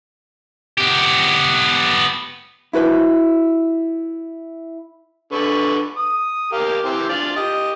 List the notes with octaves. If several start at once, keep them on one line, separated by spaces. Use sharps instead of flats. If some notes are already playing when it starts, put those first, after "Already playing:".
B3 G4
E4 F#4 B4 C5
D3 B4 C#6
D#6
G4 A#4 F5
E3 C4 G4
D4 F4 D5
G4 D#5